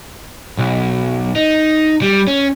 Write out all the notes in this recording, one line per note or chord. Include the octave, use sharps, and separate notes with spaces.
B1
D#4
G3
C#4